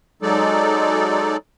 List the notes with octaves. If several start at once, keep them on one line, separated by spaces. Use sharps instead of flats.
F#3 G#3 D#4 A4 D5